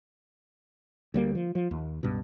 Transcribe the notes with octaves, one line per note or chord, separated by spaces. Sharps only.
D2 G3 A#3
F3
F3
D#2
C#2 G2 B2